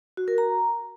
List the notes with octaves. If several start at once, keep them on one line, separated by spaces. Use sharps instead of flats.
F#4
A#4
A#5